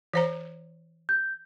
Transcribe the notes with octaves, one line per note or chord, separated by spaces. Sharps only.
E3 C5 A#5
G6